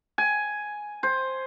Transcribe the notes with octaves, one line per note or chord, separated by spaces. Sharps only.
G#5
C5